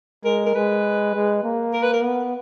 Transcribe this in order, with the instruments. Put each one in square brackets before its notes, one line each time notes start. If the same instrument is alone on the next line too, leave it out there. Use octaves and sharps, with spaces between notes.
[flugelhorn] G#3 [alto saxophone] A#4
[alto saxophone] A#4
[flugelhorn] G#3 [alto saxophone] B4
[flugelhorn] G#3
A#3
[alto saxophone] A#4
B4
A#4
[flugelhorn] B3